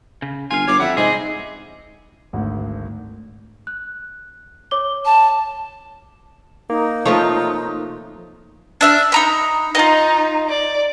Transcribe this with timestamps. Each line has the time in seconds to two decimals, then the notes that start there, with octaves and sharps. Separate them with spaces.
0.22 C#3
0.51 G1 F4 F5 G#5
0.67 G1 C#5 D6
0.80 F2 G3 E5 F#5
0.97 G#2 C3 C4 G#4 D#5
2.33 G#1 D2
3.67 F#6
4.71 C#5 D6 G7
5.05 A5
6.70 A#3 D#4
7.05 C3 F3 A3 F4 C#5
8.81 D4 E5 F6
9.12 D#4 A#5 B5
9.75 D#4 F4 D#5
10.49 D5